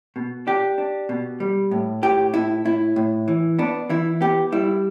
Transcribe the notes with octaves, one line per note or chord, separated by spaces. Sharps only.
B2
D4 G4
D4
B2
G3
A2
A2 G4
A2 E4
A2 E4
A2
E3
B3 D4
E3 E4
B3 G4
G3 E4